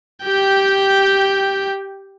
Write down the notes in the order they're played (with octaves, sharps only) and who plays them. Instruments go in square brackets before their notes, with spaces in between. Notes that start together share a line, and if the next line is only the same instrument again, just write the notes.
[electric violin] G4 G5